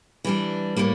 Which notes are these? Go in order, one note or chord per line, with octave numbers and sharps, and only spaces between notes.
E3 G3 D4
A2 G3 A#3